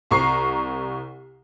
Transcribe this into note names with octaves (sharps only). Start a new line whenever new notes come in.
C2 A#5 C#6 C7